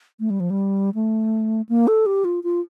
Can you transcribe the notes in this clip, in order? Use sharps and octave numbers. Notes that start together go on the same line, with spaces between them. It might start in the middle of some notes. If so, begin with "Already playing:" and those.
A3
G3
F3
G3
A3
A#3
A4
G4
F4
F4